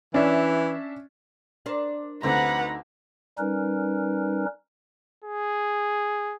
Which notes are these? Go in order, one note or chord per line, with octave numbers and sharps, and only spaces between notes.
E3 C#4 D4 E5
D4 A#4 C5
D2 D3 C4 D#4 B4 F#5 A#5
G3 C#4 D#4 A#4 B4
G#4